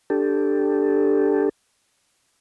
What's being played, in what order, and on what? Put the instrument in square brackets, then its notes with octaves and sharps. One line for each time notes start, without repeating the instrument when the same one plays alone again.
[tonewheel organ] D4 G4 A4